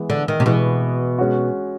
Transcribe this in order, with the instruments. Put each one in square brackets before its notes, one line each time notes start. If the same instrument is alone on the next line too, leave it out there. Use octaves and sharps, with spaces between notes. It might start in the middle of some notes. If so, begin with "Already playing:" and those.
Already playing: [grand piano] E3 G#3 B3
[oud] D3
D#3
C3
[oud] B2 [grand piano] E3 G#3 B3
[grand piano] G#3 C#4 F#4